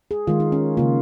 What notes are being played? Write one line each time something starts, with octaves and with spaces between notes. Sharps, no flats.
G#4
D#3 G#3 F4
D#4
C#4
C#3 A#3 F4